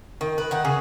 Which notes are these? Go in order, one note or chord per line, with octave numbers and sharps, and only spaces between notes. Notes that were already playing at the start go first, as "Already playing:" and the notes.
D#3
B4
D#3 F#5
C#3 G#4